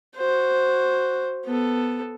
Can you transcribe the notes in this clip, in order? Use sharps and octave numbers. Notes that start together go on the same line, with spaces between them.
F#4 C5
B3 A4